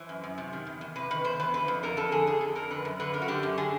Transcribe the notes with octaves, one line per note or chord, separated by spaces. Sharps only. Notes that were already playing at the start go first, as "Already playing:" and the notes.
Already playing: E3 C5
F#2
F#2
C3
D#3
E2
E2
C3 B4
D#3 B4
E2 C5
E2 B4
D3 B4
F2
D3 A#4
F2 A4
D3 G#4
F2 G#4
D3 A4
F2 A#4
D3 B4
F#2
D3 B4
F#2 A#4
F#4
D3 G4
F#2
D3 G#4